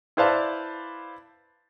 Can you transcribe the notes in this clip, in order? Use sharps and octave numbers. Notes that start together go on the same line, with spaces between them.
E4 B4 C5 D5 F5 A5